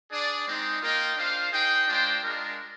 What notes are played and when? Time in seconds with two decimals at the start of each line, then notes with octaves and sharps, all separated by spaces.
0.11 D4 G#4 D5
0.46 G#3 C4 D#4
0.81 A#3 F4 A#4 D#5 G5
1.16 D4 F4 C5 F5
1.52 D#4 G#4 C5 G5
1.88 G#3 D4 F4 C5 G5
2.23 G#3 D4 F4 A#4